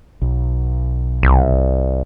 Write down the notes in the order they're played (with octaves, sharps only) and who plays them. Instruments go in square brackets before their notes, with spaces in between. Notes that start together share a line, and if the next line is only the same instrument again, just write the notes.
[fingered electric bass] B1
[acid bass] C2